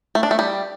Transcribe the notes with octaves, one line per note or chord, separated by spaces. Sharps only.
A3
D4
A3
G3